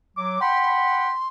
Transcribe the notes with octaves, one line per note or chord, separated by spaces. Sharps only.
F#3 D6
F#5 G5 B5 C6